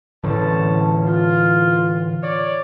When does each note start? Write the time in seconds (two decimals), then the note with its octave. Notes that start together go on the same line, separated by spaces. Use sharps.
0.24 A2 D3 E3 C#4 A5
1.05 F4
2.23 C#5 D5